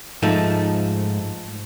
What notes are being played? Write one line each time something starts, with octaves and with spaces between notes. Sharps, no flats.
G#2 F3 A3 D#4